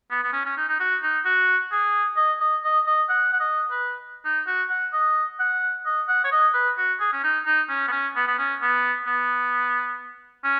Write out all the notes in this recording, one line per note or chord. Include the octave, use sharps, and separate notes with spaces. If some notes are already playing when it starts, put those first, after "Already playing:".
B3
B3
C#4
C#4
D#4
D#4
F#4
D#4
F#4
G#4
D#5
D#5
D#5
D#5
F#5
F#5
D#5
B4
D#4
F#4
F#5
D#5
F#5
D#5
F#5
C#5
D#5
B4
F#4
G#4
C#4
D#4
D#4
C#4
B3
C#4
B3
B3
C#4
B3
B3
C#4